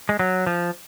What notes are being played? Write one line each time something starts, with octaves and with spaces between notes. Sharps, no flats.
G#3
F#3
F3